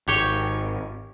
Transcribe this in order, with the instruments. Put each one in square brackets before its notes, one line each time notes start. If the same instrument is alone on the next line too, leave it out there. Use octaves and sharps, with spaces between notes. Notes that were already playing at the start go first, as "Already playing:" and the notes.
[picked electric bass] G#1 [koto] G4 C#5 G5